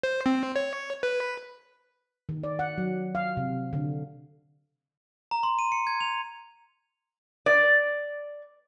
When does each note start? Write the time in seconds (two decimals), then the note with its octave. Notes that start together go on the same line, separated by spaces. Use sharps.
0.03 C5
0.26 C4
0.56 C#5
1.03 B4
2.29 D#3
2.44 D5
2.59 F#5
2.78 F#3
3.15 F5
3.37 C3
3.73 D3
5.31 A#5
5.43 C6
5.59 D#7
5.72 C#7
5.87 G#6
6.01 F7
7.46 D5